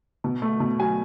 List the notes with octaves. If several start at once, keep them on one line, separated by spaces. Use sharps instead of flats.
B2
A3
B2
F#3 G#5